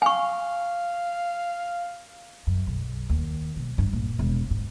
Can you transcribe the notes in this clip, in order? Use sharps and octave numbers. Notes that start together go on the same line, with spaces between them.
F5 G#5 C#6
F#2
B1
D#2
B1
G2
A#2
E1
G#2